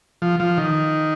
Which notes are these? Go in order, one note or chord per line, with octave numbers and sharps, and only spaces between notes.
F3
F3
D#3